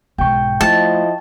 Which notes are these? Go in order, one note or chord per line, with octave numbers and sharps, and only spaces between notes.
B1 G#2 G5 C#6
F3 A3 E4 D#5 A5